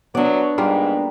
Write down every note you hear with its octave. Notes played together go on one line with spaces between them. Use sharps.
F#3 B3 D4 D5
G#2 G3 A#3 F4